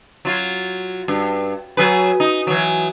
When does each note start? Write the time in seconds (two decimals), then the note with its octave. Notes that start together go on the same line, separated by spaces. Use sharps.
0.25 F#3 F4
1.08 G2
1.77 F#3 G#4 B4
2.20 D#4
2.47 E3 F#3